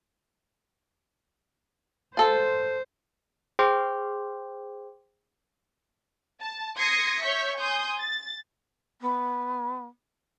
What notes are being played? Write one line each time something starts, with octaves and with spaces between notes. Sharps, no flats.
F4 A4 C5
G#4 C5 G5 C6 D6 G6
A5
C6 D#6 G#6 A#6 C7 C#7
C#5 E5 C#6 G6 B6
G#5 C6 D#6 G6
A6
B3